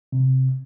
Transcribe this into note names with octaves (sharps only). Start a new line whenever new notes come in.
C3